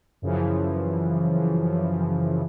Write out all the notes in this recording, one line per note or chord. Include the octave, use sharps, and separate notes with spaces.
F#2 C#3 E3 F3